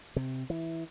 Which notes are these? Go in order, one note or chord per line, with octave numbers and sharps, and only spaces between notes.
C3
E3